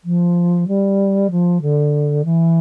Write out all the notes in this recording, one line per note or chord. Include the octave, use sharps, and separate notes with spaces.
F3
G3
F3
D3
E3